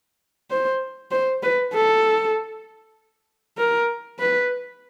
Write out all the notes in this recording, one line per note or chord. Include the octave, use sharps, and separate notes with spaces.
C5
C5
B4
A4
A#4
B4